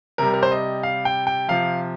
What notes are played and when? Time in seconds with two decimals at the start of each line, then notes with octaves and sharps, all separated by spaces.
0.18 C3 G3 A#4
0.34 A#4
0.43 C5
0.52 D#5
0.83 F5
1.05 G5
1.27 G5
1.48 C3 F3 F5